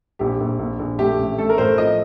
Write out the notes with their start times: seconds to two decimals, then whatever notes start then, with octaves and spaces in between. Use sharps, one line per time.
0.19 A#1 G4
0.40 A#1
0.59 A#1
0.79 A#1
0.99 A3 G4
1.19 A1
1.38 A3 A4
1.49 A#4
1.58 A2 C5
1.78 F3 D#5